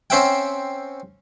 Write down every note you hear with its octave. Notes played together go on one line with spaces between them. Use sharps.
C4 C#4 C5 E5 F#5 G5